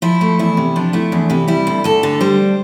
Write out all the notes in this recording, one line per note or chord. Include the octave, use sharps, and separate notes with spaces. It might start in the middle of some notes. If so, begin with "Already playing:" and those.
F3 E4
A3
E2 E4
C3
F3 D4
A3 E4
E2 D4
C3 E4
G3 E4
D2
D2 A4
D3
G3 C5